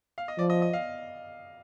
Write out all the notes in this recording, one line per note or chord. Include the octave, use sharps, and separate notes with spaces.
F5
D#5
F3 D5
D#5
D#5
F5